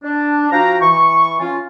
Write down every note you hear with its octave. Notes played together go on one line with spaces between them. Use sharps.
D4
F3 F#4 F5 G5 A#5
E3 C#6
C#4 F4